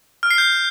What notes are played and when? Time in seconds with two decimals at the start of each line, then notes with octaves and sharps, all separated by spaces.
0.23 F6
0.31 C7
0.38 G6